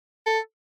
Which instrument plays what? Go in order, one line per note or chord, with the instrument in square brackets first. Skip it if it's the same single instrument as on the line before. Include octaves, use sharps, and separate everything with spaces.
[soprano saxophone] A4